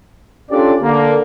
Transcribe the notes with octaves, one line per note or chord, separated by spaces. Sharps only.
C#4 D4 F4 G4 A4 D5
D3 A#3